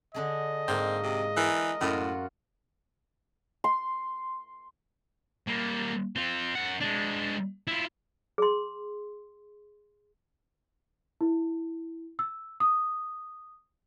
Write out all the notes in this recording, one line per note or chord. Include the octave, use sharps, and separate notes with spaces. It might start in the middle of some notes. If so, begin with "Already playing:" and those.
D3 D4 G#4 D#5
G#2 A#3 C4
C3
E3 A#4 A5
F#2 A2 F4 F#4
C6
G3 A#3
C4 F4
F#2 F#5
G#3 D4
E4 F4
G#4 C6
E4
E6
D#6